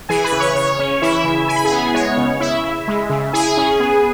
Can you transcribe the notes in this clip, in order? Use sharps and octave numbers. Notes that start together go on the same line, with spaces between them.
E3 G#4 G#5
B4 B5
C#3
C#5 C#6
C#3 C#5
C#4
E3 E4 E5
C#3
E4 G#5
B5
G#4 G#5
B3
G#3 C#5
C#3
C#3 E4 E5
E4
G#3
C#3
E4 G#4 G#5
C#4
B3